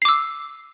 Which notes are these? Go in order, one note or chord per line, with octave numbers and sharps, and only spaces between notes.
D6 E6 C7